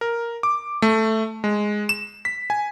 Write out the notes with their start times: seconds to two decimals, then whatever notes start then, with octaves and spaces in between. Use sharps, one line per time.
0.01 A#4
0.43 D6
0.82 A3
1.44 G#3
1.89 E7
2.25 B6
2.50 G#5